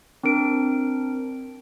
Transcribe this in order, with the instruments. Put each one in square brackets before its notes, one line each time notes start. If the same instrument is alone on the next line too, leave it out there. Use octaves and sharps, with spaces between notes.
[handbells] C4 D4 A#4 D7